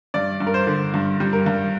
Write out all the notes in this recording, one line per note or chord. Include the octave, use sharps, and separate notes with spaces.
G2 D5
G2
A#4
C5
D3
G2
G3
A#4
G2